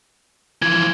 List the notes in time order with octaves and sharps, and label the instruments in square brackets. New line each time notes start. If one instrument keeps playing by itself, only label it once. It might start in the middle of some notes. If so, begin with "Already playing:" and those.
[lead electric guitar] E3 F3 [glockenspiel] G#6